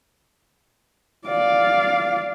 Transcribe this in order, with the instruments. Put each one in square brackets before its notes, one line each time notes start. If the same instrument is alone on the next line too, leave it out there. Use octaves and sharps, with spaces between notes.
[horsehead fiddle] D5 F5